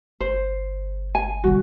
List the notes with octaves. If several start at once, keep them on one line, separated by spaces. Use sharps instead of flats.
G1 C5
G#5
D3 G3 F#4